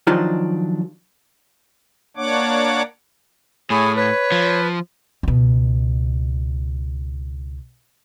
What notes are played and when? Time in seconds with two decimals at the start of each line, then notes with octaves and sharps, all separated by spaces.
0.07 D#3 F3 F#3 D4 D#4 F4
2.17 A#3 D4 C#5 F#5 D6
3.70 A2 G#4 C#5 G#5 B5
3.96 B4 C#5
4.32 F3
5.23 C#2 B2